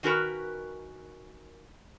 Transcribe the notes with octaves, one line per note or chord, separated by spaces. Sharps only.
D#3 C#4 F#4 A#4 B4